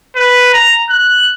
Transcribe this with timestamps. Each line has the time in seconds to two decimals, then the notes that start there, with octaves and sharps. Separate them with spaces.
0.16 B4
0.53 A#5
0.90 F#6